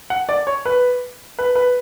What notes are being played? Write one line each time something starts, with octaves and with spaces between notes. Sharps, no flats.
F#5
D5
C#5
B4
B4
B4